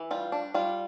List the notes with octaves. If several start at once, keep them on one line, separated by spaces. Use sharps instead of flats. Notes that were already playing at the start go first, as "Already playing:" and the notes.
Already playing: E3
G3 F4
D4
G3 F4